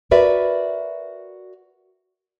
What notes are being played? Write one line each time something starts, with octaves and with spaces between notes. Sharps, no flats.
F#4 A#4 B4 D5 E5